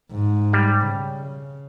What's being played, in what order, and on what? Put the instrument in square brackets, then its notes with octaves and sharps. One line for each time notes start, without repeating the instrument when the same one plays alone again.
[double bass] G#2
[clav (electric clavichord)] G3
[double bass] C#3